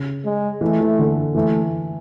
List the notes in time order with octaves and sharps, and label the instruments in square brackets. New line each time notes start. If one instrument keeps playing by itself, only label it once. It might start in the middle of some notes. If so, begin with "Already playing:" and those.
Already playing: [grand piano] C#3
[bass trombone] G#3
[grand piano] E3 [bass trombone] A3
[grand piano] E3
D3
[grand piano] E3 [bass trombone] A3